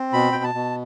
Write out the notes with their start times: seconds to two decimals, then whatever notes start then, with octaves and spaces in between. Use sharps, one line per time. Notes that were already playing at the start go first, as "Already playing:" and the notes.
Already playing: C4
0.13 B2 B5
0.32 B2 G5
0.44 A5
0.55 B2